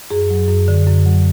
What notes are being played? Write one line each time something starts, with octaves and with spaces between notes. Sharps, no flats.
F#2 G#4
F#3
F#2
D3
F#2
F#3